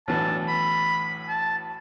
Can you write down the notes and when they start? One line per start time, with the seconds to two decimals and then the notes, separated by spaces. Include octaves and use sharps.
0.08 B1 A2 E3 B3 D4 A5
0.48 B5
1.28 A5